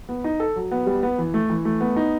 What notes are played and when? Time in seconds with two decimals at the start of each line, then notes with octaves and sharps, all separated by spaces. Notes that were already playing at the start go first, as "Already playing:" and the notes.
0.09 B3
0.24 D#4
0.40 A4
0.56 F#3
0.71 B3
0.86 G3
1.03 B3
1.18 E3
1.34 A3
1.50 E3
1.65 A3
1.81 B3
1.96 D#4